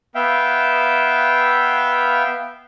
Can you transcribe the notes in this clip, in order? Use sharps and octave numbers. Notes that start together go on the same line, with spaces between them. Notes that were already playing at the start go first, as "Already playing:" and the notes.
B3 E5 F5 G5